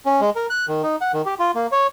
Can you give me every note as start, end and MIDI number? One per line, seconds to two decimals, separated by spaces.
0.06 0.21 61
0.21 0.30 56
0.36 0.46 70
0.50 0.66 90
0.68 0.82 51
0.83 0.96 63
1.01 1.12 78
1.14 1.22 51
1.26 1.35 67
1.39 1.51 65
1.55 1.67 58
1.72 1.87 73